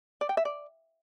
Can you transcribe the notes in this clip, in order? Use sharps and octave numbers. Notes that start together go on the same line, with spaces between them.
D5
G5
E5
D5